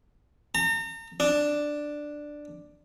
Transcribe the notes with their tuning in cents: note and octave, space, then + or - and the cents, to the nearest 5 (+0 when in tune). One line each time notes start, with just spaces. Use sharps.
A#5 -40
D4 +5